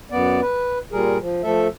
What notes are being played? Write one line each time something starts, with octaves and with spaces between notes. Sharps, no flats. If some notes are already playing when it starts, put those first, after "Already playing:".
F#2 B3 D5
B4
A#2 G3 G#4 A#4
F3
F3 A3 A4 E5